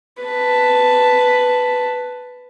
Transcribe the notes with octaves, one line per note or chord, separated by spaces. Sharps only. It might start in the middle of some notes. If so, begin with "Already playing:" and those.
B4 A5